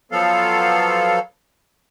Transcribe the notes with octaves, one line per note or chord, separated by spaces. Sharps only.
F3 F#3 B3 A4 F5